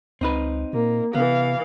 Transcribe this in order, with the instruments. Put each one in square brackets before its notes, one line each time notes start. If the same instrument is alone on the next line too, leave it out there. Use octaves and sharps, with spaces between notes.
[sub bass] C#2 [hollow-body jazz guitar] C4 D#4 B4
[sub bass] A#2 [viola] A#3
[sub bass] C3 [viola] E3 F5 [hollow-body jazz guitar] B3